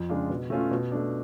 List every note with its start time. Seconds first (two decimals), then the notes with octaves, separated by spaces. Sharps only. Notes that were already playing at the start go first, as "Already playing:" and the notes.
Already playing: F2
0.09 C#3 G#3 D4 F4
0.30 B2
0.50 A3 C#4 F4
0.71 B2
0.92 A3 D4